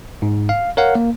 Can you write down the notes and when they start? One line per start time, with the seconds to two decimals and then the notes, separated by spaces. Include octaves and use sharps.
0.22 G#2
0.49 F5
0.77 A#4 C#5 F5 F#5
0.95 A#3